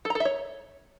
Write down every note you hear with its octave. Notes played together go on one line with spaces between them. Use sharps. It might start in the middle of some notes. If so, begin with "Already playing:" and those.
A4
A#5
A4
E5
C#5